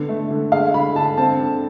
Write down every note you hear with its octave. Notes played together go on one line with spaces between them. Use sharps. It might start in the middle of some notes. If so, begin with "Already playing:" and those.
Already playing: D3 B3
A3
D3
G#3 F5
D3 B5
D3 A5
C4 A5
D3